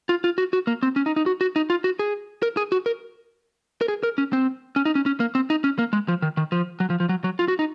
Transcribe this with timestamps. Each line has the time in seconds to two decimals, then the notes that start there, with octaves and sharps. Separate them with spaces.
0.09 F4
0.24 F4
0.38 F#4
0.53 F#4
0.67 A#3
0.83 C4
0.96 C#4
1.06 D#4
1.16 D#4
1.26 F#4
1.41 F#4
1.56 D#4
1.70 F4
1.84 F#4
1.99 G#4
2.43 A#4
2.57 G#4
2.72 F#4
2.86 A#4
3.81 A#4
3.88 G#4
4.03 A#4
4.18 C#4
4.33 C4
4.76 C#4
4.85 D#4
4.95 C#4
5.06 C#4
5.20 A#3
5.35 C4
5.50 D#4
5.64 C#4
5.78 A#3
5.93 G#3
6.08 F3
6.22 D#3
6.37 D#3
6.52 F3
6.80 F#3
6.90 F3
7.00 F3
7.09 F#3
7.24 F#3
7.39 F4
7.48 F#4
7.59 D#4